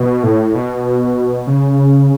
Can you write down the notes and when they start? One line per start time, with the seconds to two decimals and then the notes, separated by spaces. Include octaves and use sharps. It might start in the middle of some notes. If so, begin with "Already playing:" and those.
Already playing: B2
0.23 A2
0.55 B2
1.47 C#3